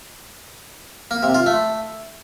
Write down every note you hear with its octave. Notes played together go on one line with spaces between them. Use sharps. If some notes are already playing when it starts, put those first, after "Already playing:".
A#3
C3
F4
A3